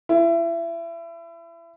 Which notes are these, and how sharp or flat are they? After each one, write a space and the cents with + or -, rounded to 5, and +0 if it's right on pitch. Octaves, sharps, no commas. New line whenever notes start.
E4 +30